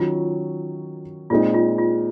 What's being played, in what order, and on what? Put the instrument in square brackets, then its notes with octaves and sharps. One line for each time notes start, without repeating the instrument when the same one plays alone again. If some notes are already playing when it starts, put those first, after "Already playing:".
Already playing: [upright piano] D#3 F#3 C#4 [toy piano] F4
[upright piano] A#2 G#3 C4 D#4 [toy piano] F4
[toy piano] F4
F4